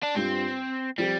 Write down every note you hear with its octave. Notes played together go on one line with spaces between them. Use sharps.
D4
G2 G3 C4 F4
F3 G3 C4 G4